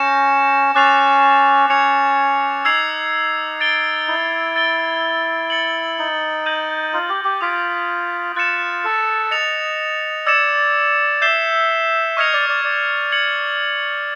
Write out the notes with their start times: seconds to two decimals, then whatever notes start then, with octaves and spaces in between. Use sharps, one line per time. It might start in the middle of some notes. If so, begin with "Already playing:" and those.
Already playing: C#4 G6 A#6 C#7 E7
0.75 C#4 D6 F#6 A6 C7 F7
1.70 C#4 G#6 C#7 F7
2.65 D#4 E6 G#6 C7 F7
3.60 A6 D7 G7
4.08 E4
4.56 A6 D7 G7
5.50 A6 C#7 F#7
5.99 D#4
6.46 G6 A#6 D#7 F#7
6.93 F4
7.09 G4
7.25 G4
7.41 F4 D#6 G#6 B6 D7
8.36 F4 F#6 A6 C#7 E7
8.84 A4
9.31 D#5 A6 C#7 F7
10.26 D5 E6 G#6 C#7 E7
11.21 E5 G6 C7 E7 G7
12.17 D#5 C#6 F6 G#6 C#7 F7
12.33 D5
12.49 D5
12.64 D5
13.12 G#6 C#7 F#7